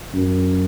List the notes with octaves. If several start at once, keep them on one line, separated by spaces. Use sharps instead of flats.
F#2